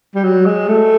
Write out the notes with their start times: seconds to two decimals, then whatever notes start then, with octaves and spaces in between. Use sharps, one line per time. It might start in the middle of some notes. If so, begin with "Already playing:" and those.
0.15 G3
0.23 F#3
0.46 G#3
0.68 A3